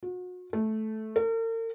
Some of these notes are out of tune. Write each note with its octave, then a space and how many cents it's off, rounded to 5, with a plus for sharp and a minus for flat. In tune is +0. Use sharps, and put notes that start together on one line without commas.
F#4 -35
A3 -10
A#4 -45